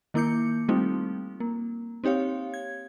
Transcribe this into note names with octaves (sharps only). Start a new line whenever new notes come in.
D#3 A#3 E4 D6 G6 C#7
G3 A3 C4 D#4 F4
A#3
C4 D#4 G4 C#5 F5
G#6